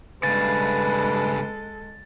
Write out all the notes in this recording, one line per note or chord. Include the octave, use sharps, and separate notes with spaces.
G2 C#3 G#3 A4 B4 A6